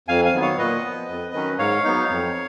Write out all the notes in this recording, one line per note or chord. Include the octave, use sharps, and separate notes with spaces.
F2 F5 G#5
F5 G#5
D#3 F#3 B3
C#5 F5
A#2 B4 D#5
F3 B3
F2
D#3 F#3 C#4
G#2 C#5 F5
F#3 B3 D#4
F2